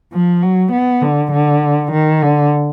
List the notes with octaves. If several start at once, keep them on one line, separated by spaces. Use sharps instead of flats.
F3
F#3
B3
D3
D3
D#3
D3